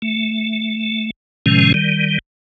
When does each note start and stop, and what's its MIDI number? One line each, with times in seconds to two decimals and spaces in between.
0.02 1.11 57
1.46 1.72 45
1.46 1.72 48
1.46 1.72 51
1.46 1.72 53
1.46 1.72 56
1.46 1.72 61
1.74 2.18 51
1.74 2.18 55